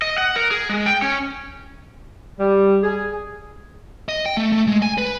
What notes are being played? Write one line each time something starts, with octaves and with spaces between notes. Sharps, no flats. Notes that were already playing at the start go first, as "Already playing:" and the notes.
D#5
F#5
A#4
G#4
G#3
G5
C#4
G3
G#4
D#5
G5
A3
A3
G#3
G#5
B4